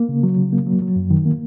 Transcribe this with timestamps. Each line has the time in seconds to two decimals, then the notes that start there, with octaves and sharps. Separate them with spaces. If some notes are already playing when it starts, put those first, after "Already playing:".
Already playing: A#3
0.09 C#3
0.23 F#3
0.37 C#3
0.53 A#3
0.67 F#3
0.82 F#3
0.96 F#2
1.11 D#3
1.26 A#3